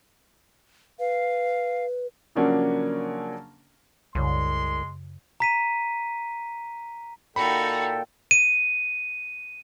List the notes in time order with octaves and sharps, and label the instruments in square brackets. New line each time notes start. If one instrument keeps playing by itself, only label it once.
[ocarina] B4 [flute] F5
[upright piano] C#3 F3 F#3 A#3 C#4 D4
[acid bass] C2 [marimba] F#2 C#3 [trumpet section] G#3 C6
[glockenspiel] A#5 B6 D#7
[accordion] A#2 G5 [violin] D#4 F#4 [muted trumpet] A4 [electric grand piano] B5
[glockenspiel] D#7